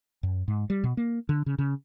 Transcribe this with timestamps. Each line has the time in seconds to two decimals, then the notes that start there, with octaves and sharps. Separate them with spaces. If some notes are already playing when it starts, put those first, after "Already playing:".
0.23 F#2
0.48 G#2
0.70 G3
0.84 B2
0.97 A#3
1.29 D3
1.46 C#3
1.59 C#3